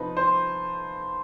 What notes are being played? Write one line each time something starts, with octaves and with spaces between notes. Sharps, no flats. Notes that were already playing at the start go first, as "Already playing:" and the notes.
Already playing: C3 F3 D#4 B4
C5